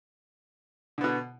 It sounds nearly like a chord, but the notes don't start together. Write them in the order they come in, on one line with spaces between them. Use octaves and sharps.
D3 B3 B2